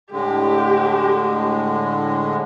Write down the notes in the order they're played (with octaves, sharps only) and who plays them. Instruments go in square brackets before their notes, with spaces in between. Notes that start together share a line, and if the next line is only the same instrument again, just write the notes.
[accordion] A2 D3 G#3 [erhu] G4